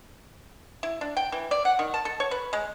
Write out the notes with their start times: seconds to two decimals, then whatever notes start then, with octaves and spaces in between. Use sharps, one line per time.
0.83 E4
1.01 D4
1.17 G5
1.32 E3
1.51 D5
1.65 F#5
1.79 D#3
1.94 A5
2.05 A4
2.20 C#5
2.31 B4
2.53 G#3